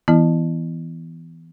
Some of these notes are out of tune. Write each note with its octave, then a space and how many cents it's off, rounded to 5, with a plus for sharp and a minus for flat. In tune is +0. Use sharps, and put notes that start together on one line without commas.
E3 -5 B3 +0 E4 +0